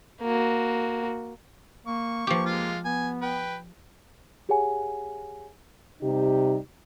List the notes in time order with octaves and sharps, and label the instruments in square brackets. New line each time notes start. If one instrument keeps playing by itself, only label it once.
[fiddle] A#3 F#4
[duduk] A#3 [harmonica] C#6
[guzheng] F3 G4 [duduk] A#3
[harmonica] G#3 F4 F5
[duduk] B3 [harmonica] G#5
[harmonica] B4 G5
[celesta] G4 G#4 C#5 F#5 G#5
[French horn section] C3 G3 D#4 G4